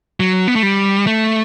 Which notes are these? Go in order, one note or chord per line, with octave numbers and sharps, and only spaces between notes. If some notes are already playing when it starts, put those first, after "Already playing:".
F#3
B3
A3
G3
A3